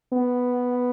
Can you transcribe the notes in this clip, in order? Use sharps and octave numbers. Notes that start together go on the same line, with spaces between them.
B3